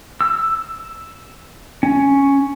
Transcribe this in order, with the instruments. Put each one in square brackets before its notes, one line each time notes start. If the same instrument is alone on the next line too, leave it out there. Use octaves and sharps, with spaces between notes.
[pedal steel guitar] E6
C#4